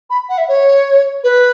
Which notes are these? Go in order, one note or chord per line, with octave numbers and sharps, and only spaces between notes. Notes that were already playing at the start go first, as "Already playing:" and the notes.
B5
F#5
E5
C#5
B4